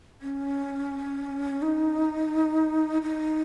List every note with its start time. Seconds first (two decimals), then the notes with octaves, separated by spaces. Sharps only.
0.22 C#4
1.62 D#4
3.02 D#4